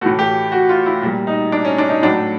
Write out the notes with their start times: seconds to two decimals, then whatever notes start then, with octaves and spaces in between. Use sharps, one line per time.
0.01 A2 E3 A3 F#4
0.19 G4
0.52 F#4
0.69 F4
0.86 E4
1.02 A#2 G3
1.27 D#4
1.52 D4
1.65 C#4
1.78 D4
1.90 D#4
2.02 A2 F#3 A3 D4